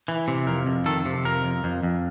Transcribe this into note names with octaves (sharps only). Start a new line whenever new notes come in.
E3
C3
F2 A#4
F2
D#3 A4
C3
F2 A#4
F2
F2
F2